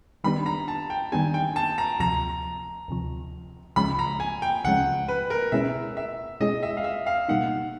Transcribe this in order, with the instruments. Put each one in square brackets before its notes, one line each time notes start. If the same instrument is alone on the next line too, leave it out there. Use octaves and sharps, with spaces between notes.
[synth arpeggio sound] D#3 G3 B3 D4 G4 [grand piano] B5
[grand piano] A#5
A5
G5
[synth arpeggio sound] D#3 G3 B3 D4 G4 [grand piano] G#5
[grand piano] G5
A5
A#5
[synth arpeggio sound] D2 C3 F3 [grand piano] A#5
[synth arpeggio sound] D2 C3 F3
[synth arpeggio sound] C#2 C#3 F3 G#3 C#4 [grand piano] B5
[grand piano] A#5
G#5
G5
[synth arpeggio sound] C#2 C#3 F3 G#3 C#4 [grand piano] F#5
[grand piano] B4
A#4
[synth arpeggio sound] B2 G#3 C#4 E4 G#4 [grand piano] E5
[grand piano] E5
[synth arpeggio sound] B2 G#3 C#4 E4 G#4 [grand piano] D#5
[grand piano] E5
F5
E5
F5
[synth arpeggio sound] B2 G3 A#3 D#4 [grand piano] F#5